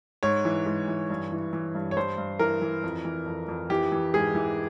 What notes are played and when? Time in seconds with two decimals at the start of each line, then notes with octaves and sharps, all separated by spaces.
0.23 G#2 C#5
0.45 E3
0.66 G#2
0.88 E3
1.10 G2
1.32 E3
1.53 E3
1.75 G2
1.91 C#5
1.96 G2 C5
2.18 G2
2.39 E3 A#4
2.62 E3
2.83 F2
3.05 E3
3.26 F2
3.48 F2
3.70 E3 G4
3.92 E3
4.14 G#2 G#4
4.35 E3